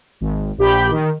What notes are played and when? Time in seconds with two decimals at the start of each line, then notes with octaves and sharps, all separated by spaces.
0.21 G#1
0.58 A#1 G4 B5 G6
0.91 D#3